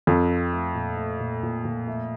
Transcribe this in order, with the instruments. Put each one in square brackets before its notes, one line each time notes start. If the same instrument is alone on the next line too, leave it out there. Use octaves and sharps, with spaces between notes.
[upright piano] F2 [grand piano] F4
[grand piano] C4
A3
A#2
A3
A#2
A#2
A#2
A3